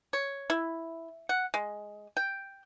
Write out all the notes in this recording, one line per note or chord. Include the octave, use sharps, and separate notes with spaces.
C#5
E4
F#5
G#3
G5